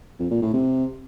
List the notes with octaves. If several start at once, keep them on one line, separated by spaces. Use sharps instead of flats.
F2
A#2
A2
C3